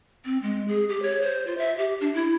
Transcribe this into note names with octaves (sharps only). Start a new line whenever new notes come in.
C4
G#3
G#4
G4
C#5
C5
F4
E5
G4
D4
E4